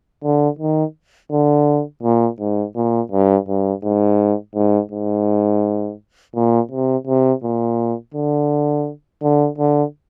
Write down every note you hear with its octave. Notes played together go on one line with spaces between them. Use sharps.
D3
D#3
D3
A#2
G#2
A#2
G2
G2
G#2
G#2
G#2
A#2
C3
C3
A#2
D3
D3
D3